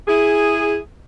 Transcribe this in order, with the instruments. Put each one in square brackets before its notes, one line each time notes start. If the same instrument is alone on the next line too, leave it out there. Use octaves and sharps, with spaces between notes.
[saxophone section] E4 G#4